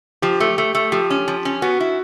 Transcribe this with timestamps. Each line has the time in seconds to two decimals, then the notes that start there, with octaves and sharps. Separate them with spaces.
0.22 F3 G4
0.40 A3
0.58 A3
0.75 A3
0.92 F3 G4
1.10 C#4
1.28 F3
1.45 C#4
1.62 B3 F#4
1.80 E4